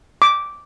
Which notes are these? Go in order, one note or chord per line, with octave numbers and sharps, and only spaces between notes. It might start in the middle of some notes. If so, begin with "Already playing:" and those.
D6